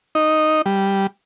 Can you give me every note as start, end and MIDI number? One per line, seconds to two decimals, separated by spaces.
0.15 0.62 63
0.66 1.07 55